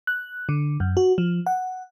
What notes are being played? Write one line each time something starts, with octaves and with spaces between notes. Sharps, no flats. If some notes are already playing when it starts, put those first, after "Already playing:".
F#6
D3
F#2
F#4
F3
F#5